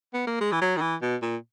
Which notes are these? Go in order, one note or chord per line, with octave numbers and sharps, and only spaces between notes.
B3
A#3
G#3
E3
F#3
D#3
E3
B2
A#2